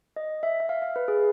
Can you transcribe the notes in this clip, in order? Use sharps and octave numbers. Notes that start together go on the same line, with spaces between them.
D#5
E5
E5
F5
F5
B4
G#4